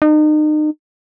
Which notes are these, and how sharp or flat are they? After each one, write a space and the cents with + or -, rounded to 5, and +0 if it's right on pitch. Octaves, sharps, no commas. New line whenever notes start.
D#4 -35